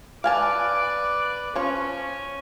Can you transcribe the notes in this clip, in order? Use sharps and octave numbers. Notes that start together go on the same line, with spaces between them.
B4 D5 F5 G#5 A5
F3 C#4 C#5